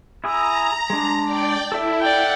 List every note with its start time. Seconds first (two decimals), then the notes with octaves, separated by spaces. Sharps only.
0.24 E4 G#4 A#5 E6
0.90 G#3 D4
1.24 D5 G5
1.72 E4 A4 E5
2.00 D5 F#5 G5